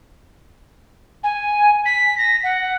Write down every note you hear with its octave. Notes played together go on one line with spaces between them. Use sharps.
G#5
B6
A#6
F#5